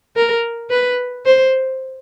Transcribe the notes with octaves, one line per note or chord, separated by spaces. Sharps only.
A#4
B4
C5